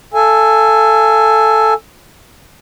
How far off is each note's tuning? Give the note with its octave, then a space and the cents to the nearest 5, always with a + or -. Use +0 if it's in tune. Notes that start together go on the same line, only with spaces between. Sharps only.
A4 +0 F5 -40 G#5 +0